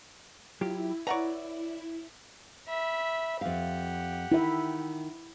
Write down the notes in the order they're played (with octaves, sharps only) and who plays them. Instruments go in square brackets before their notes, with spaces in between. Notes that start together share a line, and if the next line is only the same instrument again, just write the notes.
[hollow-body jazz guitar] F#3 F4 G4 [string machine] E4
[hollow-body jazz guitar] B4 D5 [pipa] C#5 F#5 A#5
[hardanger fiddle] E5 B5
[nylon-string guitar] F2 F5 [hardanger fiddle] G4 F#5
[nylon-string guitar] D#3 [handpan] E4 E5